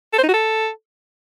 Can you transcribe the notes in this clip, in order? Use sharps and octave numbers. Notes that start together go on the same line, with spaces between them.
A4
C5
D#4
F#4
A4